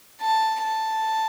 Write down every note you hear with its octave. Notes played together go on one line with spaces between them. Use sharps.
A5
A5